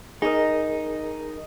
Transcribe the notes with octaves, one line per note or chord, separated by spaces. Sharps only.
D#4 G#4 A#4 D#5 E6